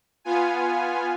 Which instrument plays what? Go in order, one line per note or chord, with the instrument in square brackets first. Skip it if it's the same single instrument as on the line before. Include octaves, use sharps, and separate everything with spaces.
[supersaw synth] B3 F4 G#5